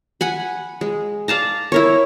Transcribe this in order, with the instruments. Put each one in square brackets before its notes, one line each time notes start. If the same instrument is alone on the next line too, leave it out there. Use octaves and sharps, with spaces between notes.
[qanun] F#5 G#5 B5
G#3
D5 F5 A5 A#5
E4 A#4 C#5